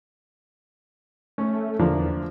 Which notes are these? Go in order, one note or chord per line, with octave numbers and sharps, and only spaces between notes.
A3 C#4
E2 D3 F3 A#3